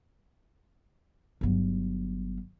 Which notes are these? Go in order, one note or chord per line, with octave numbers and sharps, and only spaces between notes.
G1 F#3